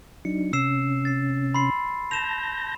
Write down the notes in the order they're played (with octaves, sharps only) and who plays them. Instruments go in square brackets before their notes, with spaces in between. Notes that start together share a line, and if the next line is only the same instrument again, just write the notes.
[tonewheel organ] F#3 D4 D#4 [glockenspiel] C#7
[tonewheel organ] C3 C#4 [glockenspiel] E6 C7 E7
[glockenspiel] A6 C7
B5 C6 C7
[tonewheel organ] A5 G6 A#6 [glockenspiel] E7 F7